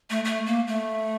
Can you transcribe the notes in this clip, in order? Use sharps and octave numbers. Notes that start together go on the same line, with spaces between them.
A3
A3
A#3
A3